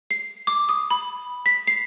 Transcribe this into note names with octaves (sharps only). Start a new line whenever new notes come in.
C7
D6
D#6
B5
B6
C7